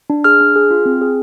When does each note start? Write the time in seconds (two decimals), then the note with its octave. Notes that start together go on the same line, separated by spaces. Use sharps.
0.10 D4
0.24 G#4 F6
0.41 D4
0.56 G#4
0.71 F4
0.86 C4
1.01 G#4